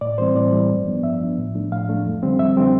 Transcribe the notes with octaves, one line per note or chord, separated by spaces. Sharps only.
A2 D5
E3 G3 C4 C5
A2 D5
E3 G3 C4
G2
F3 B3 D4
G2 E5
F3 B3 D4
A2
F3 A3 D4
A2 F5
F3 A3 D4
F2
D3 G3 C4
F2 E5
D3 G3 C4